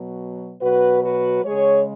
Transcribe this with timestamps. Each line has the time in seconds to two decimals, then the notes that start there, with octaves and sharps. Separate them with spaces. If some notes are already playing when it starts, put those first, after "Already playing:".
Already playing: B2 F#3
0.61 B2 F#3 F#4 B4
1.03 F#4 B4
1.44 C#3 G#3 G#4 C#5